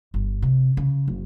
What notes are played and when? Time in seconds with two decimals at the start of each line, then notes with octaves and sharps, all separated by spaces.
0.14 G1
0.42 C3
0.77 C#3
1.08 F#1